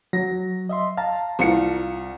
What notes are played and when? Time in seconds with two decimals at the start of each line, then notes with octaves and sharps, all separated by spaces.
0.13 F#3 A#6
0.69 D#5 E5 C6
0.97 F5 A5 A#5
1.39 C2 F4 C#7